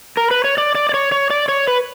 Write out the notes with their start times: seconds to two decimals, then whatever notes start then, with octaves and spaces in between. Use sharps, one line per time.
0.17 A#4
0.31 B4
0.44 C#5
0.58 D5
0.75 D5
0.89 D5
0.94 C#5
1.12 C#5
1.30 D5
1.49 C#5
1.67 B4